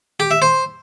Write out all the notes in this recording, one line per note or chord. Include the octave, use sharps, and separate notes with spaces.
G4
E5
C5